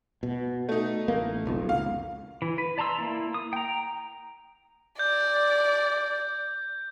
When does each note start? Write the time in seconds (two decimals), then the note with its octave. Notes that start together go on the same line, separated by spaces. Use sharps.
0.23 B2
0.69 A3 D#4
1.08 A1 A#3
1.45 F#1 B1 F2
1.69 C#2 F5
2.42 E3
2.58 B4
2.78 D5 A5 A#5 C6 E6
2.98 A#3 E4
3.34 D#6
3.53 G5 A#5
4.99 D5 G6